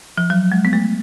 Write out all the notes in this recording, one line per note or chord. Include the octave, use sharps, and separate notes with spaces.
F3
F#3
G#3
B3
A3